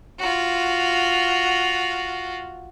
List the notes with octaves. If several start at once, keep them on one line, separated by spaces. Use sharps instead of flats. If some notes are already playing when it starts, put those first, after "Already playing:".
F4 F#4